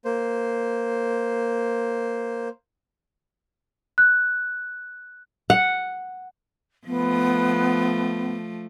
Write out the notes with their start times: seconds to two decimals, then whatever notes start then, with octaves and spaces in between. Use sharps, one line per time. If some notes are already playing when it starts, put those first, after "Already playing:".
0.05 A#3 C5
3.98 F#6
5.50 F#5
6.87 F3 A3 B3